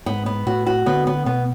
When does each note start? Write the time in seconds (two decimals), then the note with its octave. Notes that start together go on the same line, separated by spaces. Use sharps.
0.06 G#2 B3
0.26 B3
0.47 A2 F#4
0.67 F#4
0.86 D3 B3
1.07 B3
1.26 B2 B3